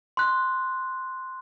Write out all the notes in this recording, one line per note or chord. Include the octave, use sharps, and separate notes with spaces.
C6 F#6